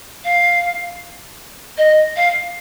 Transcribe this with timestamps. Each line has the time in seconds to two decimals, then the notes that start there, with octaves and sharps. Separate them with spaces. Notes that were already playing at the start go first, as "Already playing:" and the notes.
0.24 F5
1.77 D#5
2.16 F5